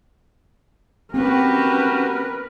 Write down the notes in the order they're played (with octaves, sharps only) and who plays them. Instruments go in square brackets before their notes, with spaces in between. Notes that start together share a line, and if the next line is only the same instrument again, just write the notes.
[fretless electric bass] C4 [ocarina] C#4 [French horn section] F#4 G4 [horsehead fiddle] A#4 B4